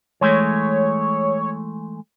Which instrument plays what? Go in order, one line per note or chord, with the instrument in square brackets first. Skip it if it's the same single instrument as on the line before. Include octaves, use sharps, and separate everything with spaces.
[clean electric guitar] E3 G#3 A3 [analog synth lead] C#5